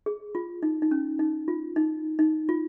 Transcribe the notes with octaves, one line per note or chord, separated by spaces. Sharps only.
G#4
F4
D#4
D#4
C#4
D#4
F4
D#4
D#4
F4